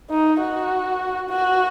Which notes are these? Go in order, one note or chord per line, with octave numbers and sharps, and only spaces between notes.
D#4
F#4
F#4